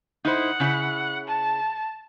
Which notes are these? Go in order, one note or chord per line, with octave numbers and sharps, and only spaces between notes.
D#4 E4 C5 F#5
C#3 E4
A5